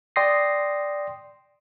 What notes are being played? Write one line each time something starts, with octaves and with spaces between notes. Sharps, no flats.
D5 G5 C6 D#6 A#6 C7